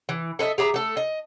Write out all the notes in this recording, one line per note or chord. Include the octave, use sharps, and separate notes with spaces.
E3
A4 B4 D#5 E5
G4 G#4 E5 A#5
A3 A4
D#5